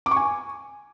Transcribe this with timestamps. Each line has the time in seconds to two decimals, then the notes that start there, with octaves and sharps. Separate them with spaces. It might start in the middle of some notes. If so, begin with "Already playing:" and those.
0.06 D6
0.11 C#6
0.17 G#5